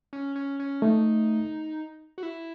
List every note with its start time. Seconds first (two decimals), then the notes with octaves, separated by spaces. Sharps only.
0.13 C#4
0.36 C#4
0.60 C#4
0.82 A3 D#4
2.18 F#4
2.23 E4